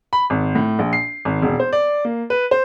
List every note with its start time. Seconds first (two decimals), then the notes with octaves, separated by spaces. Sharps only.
0.13 B5
0.30 G#1
0.55 A2
0.79 A#1
0.93 C7
1.25 G#1
1.42 E1
1.60 C5
1.73 D5
2.05 A#3
2.30 B4
2.51 C5